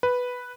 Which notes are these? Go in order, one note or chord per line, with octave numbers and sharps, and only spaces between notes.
B4